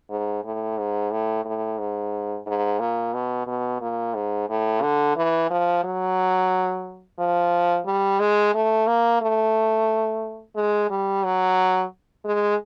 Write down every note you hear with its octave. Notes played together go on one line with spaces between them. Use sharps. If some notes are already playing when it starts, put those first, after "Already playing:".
G#2
A2
G#2
A2
A2
G#2
G#2
A#2
B2
B2
A#2
G#2
A2
D3
E3
F3
F#3
F3
G3
G#3
A3
A#3
A3
G#3
G3
F#3
G#3